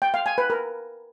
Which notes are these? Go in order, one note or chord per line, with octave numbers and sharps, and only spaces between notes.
G5
F5
G#5
B4
A#4